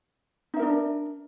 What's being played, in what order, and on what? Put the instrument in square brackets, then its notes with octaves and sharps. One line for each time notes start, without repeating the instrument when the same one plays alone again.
[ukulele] D#4
E5
A#4
D4